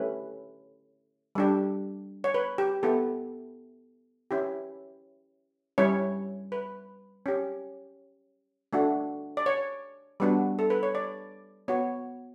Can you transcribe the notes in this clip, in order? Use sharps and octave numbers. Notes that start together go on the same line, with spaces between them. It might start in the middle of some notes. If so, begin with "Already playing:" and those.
Already playing: A3 C#4 E4 G4 B4
G3 D4 G4
C#5
B4
G4
B3 E4 G4 A4
C#4 E4 G4
G3 C#4 E4 C#5
B4
C#4 G4
A3 D4 F#4
D5
C#5
G3 B3 D4 F#4
A4
B4
C#5
D5
B3 F#4 C#5